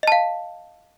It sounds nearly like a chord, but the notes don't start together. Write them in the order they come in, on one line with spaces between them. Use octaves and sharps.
D#5 A5 F5